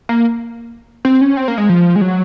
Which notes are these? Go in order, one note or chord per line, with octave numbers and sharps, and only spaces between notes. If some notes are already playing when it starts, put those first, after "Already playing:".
A#3
C4
C#4
C4
A#3
G#3
F3
G#3
F#3